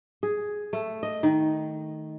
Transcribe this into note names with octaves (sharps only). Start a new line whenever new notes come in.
G#4
A3
D#5
D#3